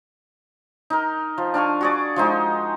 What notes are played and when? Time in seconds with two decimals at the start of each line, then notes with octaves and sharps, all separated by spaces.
0.90 D#4 A#4
1.38 F3
1.54 D4 F5 G#5 C#6
1.81 F#4 G#4 D5
2.16 F3 G#3 D#4 F#4